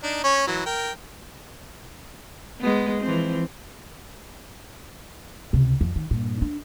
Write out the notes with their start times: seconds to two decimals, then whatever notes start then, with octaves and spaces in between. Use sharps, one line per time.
0.03 D4 D#4
0.24 C#4 C#5
0.47 E3 F#3
0.66 A#4 G5
2.61 G#3 B3
3.02 E3 F3 C4
5.53 C#2 C3
5.81 F2 F3
5.96 D#3
6.11 G2 A#2
6.42 D4